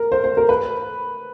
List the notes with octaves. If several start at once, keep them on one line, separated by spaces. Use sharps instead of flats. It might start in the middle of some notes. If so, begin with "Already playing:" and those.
Already playing: A#4
C5
C5
A#4
B4